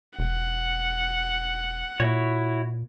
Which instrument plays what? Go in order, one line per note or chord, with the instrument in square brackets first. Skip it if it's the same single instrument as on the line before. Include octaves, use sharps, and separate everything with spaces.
[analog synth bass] E1 [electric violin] F#5
[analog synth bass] A#2 [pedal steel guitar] E4 F#4 C#5